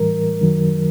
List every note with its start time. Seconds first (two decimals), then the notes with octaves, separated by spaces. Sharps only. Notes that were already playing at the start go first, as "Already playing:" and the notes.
Already playing: A2 E3 G3 A#4
0.41 F#2 D#3 F#3